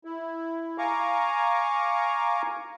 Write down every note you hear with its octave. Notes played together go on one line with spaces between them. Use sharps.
E4
F5 G#5 A#5 C#6 D6